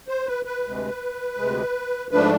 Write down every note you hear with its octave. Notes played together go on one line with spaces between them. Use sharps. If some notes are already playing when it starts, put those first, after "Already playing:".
C5
B4
B4
D2 C3 G#3
D2 C3 G#3
G#2 F3 A3 D4 B4